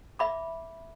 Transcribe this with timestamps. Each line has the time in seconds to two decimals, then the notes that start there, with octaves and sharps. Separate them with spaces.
0.19 E5 B5 D6